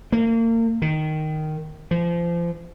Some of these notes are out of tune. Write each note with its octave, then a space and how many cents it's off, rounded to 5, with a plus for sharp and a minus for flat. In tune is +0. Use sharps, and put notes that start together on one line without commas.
A#3 -35
D#3 -5
F3 -30